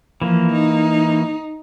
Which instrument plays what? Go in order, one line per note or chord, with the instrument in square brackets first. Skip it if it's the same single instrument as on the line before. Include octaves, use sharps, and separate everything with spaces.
[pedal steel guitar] E3 A#3 [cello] F3
[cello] D#4